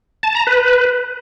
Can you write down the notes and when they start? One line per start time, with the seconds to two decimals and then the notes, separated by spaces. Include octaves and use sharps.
0.23 A5
0.35 A#5
0.47 B4